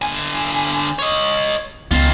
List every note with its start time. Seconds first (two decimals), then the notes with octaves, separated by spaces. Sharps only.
0.02 D3 G#5
0.99 C#5 D#5
1.91 C#2 D#3 B3 F4